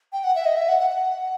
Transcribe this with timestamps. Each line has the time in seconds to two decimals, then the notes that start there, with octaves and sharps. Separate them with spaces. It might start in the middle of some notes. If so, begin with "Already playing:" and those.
0.13 G5
0.24 F#5
0.35 E5
0.45 D#5
0.57 E5
0.69 F#5
0.80 F#5
0.90 F#5